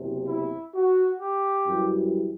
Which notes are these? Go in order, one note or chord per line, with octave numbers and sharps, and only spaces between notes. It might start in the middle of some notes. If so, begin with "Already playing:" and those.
Already playing: F#1 E2 C3
E4
F#4
G4
F#2 E3 G3